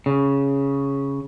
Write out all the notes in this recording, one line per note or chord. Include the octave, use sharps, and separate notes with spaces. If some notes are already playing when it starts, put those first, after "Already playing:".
C#3